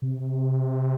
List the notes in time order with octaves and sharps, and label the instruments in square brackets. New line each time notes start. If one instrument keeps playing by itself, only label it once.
[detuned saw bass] C3